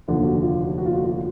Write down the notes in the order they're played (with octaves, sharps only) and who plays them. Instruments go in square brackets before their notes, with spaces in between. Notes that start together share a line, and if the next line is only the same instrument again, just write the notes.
[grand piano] F1 D#2 D3 F3 [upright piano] F4
[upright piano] F#4
F4
F#4
F#4
F4
F#4
F4